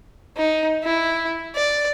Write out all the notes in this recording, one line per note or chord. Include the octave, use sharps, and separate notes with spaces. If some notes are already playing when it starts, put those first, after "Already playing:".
D#4
E4
D5